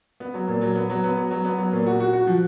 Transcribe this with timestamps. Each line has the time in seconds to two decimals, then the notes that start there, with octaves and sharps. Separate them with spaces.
0.20 B3
0.34 F#3
0.48 A#2
0.61 F#3
0.75 B3
0.90 F#3
1.04 B3
1.17 F#3
1.31 F#3
1.45 B3
1.58 F#3
1.72 A#2
1.86 F#4
2.00 F#4
2.13 F#4
2.27 F3